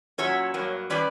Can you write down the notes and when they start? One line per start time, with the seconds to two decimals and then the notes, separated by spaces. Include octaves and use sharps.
0.18 A#2 F#3 C#4 C#5 E5
0.54 G2 F#3 A#3
0.90 E3 G3 C#4 B4 D5